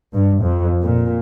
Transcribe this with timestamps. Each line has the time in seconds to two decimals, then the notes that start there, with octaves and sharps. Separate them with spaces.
0.14 G2
0.43 F2
0.81 A#2